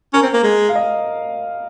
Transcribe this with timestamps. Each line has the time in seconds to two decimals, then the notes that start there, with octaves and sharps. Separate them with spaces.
0.13 C#4 A#4
0.23 C4
0.33 A#3
0.43 G#3
0.69 F5
0.75 D#5